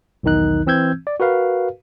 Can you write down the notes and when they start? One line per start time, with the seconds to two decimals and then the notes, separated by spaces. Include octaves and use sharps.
0.23 B1 E2 D#3 D#4 F#6
0.67 E3 C4 E6 G6 G#6
1.07 D5
1.20 F#4 A#4 B4 F5